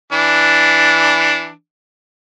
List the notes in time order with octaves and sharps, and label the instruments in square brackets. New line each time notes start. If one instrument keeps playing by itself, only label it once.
[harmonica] E3 D4